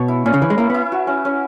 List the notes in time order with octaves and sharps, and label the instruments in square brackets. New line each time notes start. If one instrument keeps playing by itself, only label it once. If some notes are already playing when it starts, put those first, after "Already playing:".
Already playing: [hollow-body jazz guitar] B2 [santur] C#5
[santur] E4
[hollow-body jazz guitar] A#2 [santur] C#4
[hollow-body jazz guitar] C#3
[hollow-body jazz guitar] E3 [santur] B4
[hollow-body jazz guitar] G#3
[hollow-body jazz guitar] A#3 [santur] E4
[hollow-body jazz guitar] B3 [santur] E4
[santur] F#4
C#4
C#4